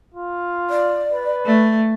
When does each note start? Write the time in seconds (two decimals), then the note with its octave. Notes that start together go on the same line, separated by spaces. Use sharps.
0.14 F4
0.69 D5
1.13 B4
1.46 A3